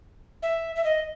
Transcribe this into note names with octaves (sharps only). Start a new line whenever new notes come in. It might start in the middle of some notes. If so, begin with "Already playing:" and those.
E5
E5
D#5